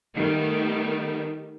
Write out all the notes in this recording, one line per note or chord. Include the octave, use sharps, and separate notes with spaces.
D#3 G3 A3 B3